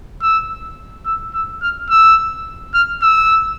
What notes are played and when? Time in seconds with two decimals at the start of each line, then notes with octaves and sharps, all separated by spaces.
0.22 E6
1.06 E6
1.34 E6
1.62 F6
1.90 E6
2.74 F6
3.02 E6